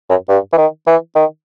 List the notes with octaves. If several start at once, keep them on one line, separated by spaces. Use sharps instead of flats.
F#2
G2
E3
D#3
E3
D#3